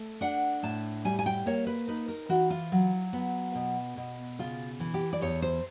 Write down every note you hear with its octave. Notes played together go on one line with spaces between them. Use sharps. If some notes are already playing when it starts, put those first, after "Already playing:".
Already playing: A3
D4 F#5
A2 A5
G3 G#5
G#5
G5
A#3 C#5
B4
D#4 B4
A#4
E3 F#4
F4
F#3
B3
B2
B2
C#3 F4
E3
G4
D5
E2 C#5
C5